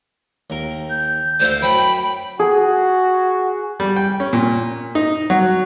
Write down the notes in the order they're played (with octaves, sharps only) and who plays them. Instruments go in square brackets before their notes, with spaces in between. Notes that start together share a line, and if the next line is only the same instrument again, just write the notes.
[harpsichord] D#2 A#4
[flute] G6
[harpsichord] D2 E4 F5 [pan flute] C5
[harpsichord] F#2 [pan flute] G5 [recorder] B5
[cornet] F#4 [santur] G#4
[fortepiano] G3
G5
C#4
A#2
D#4
F#3